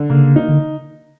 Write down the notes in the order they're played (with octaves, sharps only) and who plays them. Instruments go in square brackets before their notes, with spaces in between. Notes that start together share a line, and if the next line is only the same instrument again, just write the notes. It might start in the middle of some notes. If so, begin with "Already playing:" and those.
Already playing: [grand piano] D3
[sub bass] C#3 [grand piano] A#3
[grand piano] D#4
[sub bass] D3